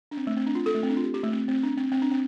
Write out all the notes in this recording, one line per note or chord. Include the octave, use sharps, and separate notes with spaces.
D4
C4
A3
C4
D4
F4
A4
A3
C4
D4
F4
G4
G4
A3
C4
C4
D4
C4
C4
D4
C4